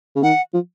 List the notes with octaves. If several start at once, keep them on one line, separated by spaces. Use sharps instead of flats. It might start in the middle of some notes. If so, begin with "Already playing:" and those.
C#3
D#3 F#5
F3